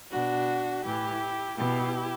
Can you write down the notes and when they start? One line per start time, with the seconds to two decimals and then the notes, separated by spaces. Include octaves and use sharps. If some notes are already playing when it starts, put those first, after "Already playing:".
0.12 B2 D4 F#4
0.85 A2 E3 E4 G4
1.57 B2 E4 G4